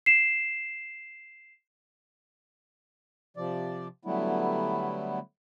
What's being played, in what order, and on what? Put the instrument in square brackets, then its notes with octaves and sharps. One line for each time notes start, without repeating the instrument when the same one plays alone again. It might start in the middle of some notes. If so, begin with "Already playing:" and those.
[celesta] C7 E7
[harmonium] C3 F3 D5
D3 F#3 G3 A3 B3 E4